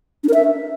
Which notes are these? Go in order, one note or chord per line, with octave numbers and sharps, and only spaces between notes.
D4
A#4
E5